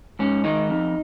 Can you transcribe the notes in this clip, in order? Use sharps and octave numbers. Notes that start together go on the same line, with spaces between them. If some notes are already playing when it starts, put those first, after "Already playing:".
G#2 C#4
D#3 G#3 D#4
F2